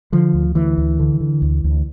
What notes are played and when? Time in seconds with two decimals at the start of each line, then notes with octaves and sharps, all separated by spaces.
0.12 D3 F3
0.34 D2
0.55 D2 E3
0.77 D2
0.99 D3
1.21 D3
1.42 D2
1.64 D2